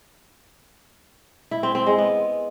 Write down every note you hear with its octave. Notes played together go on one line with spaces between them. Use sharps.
E4
C4
C4
G#3
B3